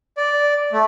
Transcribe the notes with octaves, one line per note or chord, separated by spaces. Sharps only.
D5
A3